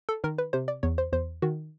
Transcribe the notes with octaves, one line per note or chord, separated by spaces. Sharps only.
A4
D#3 A#4
B4
C3 C5
D5
E2 C#5
C5
E2 C5
D#3 F#4